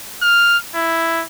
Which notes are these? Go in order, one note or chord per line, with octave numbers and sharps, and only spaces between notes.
F6
E4